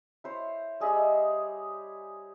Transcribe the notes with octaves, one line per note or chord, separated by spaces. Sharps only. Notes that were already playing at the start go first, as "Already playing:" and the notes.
E4 C5 C#5
G3 G#4 D#5 E5